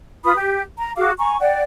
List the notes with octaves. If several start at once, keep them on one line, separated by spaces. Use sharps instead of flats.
F4 B4 B5 D#6
G4
A#5
F#4 G#4 F5 D6
G#5 A#5 C#6
D5 F#5 G5